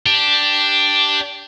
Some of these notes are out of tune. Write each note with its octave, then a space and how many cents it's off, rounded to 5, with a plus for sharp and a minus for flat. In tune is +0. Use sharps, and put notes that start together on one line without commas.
D4 +0 G4 +0